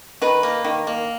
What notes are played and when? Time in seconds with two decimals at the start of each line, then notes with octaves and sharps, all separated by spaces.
0.22 D#3 B4
0.43 A#3
0.64 D#3
0.87 A#3